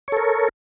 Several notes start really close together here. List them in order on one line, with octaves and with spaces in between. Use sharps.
C#5 A4 A#4